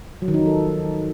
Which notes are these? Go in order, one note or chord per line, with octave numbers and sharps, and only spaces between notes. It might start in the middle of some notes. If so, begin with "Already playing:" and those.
F#3
D#3
D#4
F3
A4